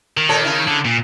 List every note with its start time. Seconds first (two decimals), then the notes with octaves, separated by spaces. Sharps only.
0.17 D#3
0.29 A#2 A4 C#5
0.45 C#3 E4
0.67 D3
0.85 A#2